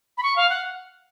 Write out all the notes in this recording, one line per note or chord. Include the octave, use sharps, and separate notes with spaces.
B5
C#6
F5
F#5